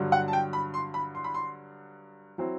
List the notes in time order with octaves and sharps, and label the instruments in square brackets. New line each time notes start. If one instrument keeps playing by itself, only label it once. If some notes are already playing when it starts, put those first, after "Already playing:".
Already playing: [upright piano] G2 D3 F#3
F#5
A5
G5
B5
C6
B5
C6
B5
C6
F#3 C4 E4